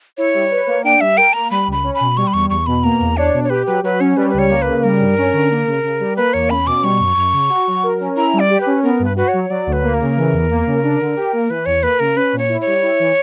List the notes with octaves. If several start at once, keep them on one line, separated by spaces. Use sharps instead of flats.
E4 C#5
G3
B4
A#3
D4 G5
G3 E5
A#4 G5
A#3 A#5
G3 B5
C#2 B5
C#4
B5
B2
G3 C#6
B5
E2 C#6
E2 C#6
B2 B5
A#3 A#5
E2
D4 C#5
B2
C#5
G4 B4
F#3 B4
F#3 B4
C#4 C#5
G3 B4
C#2 B4
C#5
A#3
C#3 B4
G3 A#4
G2
C#4
D3
A#3
C#3
C#3
G3
A#3 B4
E2 C#5
C#4 B5
B2 D6
G3 C#6
F#2
F#2
C#3
F#4
F#3
A#4
C#4
E4 A#5
G3
D5
G4
B4
C#4
B3 A#4
G2
B4
F#4 B4
C#5
F#3
F#3 D5
D2
B4
A#3
A#4
C#3
E3
E2
A#3
C#3
D4
D3
G4
A#3
E3 B4
E2 C#5
A#3 B4
C#3 A#4
C#4 B4
A#2
C#5
E4
C#5
G3
E4
E3